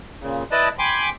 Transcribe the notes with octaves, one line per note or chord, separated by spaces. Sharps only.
A#2 C#3
E4 B4 D5 D#5 A5
G5 G#5 B5 C6 D6